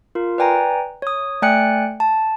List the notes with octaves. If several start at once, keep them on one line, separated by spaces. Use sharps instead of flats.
F4 A#4
B4 D5 G5 G#5 A#5
C#5 D#6
A3 D5 G5 G#5 F#6 C#7
A5